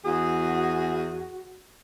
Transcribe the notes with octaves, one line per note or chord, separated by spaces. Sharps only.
E2 F#4 G#4